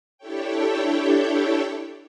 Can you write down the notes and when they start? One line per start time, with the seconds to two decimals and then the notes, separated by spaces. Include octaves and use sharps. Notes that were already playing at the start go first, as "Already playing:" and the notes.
0.18 D4 E4 G4 A4 C#5 G5